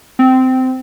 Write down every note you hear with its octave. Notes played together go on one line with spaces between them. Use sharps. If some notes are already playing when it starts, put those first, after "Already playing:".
C4